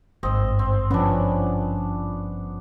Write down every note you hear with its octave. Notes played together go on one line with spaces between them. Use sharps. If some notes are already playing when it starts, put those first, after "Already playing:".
G#1 G2 C4 D#5
C4
F3 B3 C#4 D4